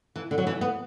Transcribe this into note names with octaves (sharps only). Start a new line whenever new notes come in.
E3
D3
F#3
E3
B3